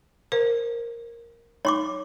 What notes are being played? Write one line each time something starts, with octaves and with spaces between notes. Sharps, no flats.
A#4 C5
D#4 C#5 C6 D6